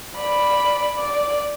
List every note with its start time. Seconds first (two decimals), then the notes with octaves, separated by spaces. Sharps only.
0.17 D5 B5
0.96 D5